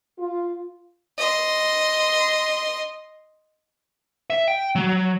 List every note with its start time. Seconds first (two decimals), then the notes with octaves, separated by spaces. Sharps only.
0.19 F4
1.19 D#5 C6
4.30 E5
4.48 G5
4.75 F#3